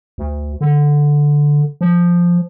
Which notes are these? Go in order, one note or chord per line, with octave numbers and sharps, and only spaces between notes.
D2
D3
F3